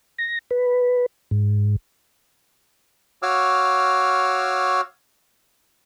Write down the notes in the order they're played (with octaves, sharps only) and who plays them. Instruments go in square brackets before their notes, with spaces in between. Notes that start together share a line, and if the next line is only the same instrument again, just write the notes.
[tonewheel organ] A#6
B4
G#2
[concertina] F#4 C#5 F5 D6 E6 F6